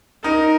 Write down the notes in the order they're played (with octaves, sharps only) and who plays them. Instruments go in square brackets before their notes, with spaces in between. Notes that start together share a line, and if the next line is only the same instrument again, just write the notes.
[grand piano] D#4 [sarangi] A#4